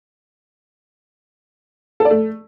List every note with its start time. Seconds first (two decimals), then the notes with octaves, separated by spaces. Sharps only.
2.00 A4
2.05 D5
2.10 A3